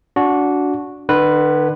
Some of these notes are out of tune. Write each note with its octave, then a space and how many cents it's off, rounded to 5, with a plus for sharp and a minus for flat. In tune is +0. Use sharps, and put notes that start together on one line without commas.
D4 -25 F#4 -10
D3 +40 B4 +0